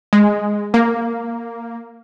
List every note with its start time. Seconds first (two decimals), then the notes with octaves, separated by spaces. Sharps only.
0.13 G#3
0.74 A#3